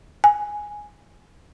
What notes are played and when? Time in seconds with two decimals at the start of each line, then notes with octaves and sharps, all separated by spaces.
0.24 G#5